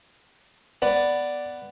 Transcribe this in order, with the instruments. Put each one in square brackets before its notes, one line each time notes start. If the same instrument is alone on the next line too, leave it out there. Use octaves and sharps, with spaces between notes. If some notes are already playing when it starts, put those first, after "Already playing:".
[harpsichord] B3 [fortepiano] D5